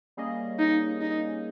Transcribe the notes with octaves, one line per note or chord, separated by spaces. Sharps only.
G3 A#3 C#4 G#4 D#5
D#4
D#4